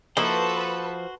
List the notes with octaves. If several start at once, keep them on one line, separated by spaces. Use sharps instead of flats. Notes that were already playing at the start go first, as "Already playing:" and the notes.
F3 A#3 D#4 E4 F#4 A4 B4 C5